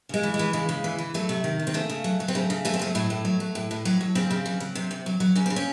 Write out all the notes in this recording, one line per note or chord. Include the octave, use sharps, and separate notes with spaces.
C#3 G#3
E3
G#3
E3
C#3 G#3
C#3
E3
E3
F#3 A3
C3
D#3
C3
C4
C#3 A3
C#3
F#3
F#3
C4
C#3 A3
C#3
F#3 A3
C4
F#3 A3
A2 A3
A2
F#3
F#3
A2
A2
F#3
F#3
C#3 C4
C#3
F#3
F#3
C3
C3
F#3
F#3
C#3 C#4
C#3 C4
C#4